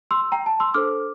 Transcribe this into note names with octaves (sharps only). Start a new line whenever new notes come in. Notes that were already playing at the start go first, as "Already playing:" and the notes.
C6 E6
G5 A#5
A5
C6 E6
D4 A4 C5 D6 F6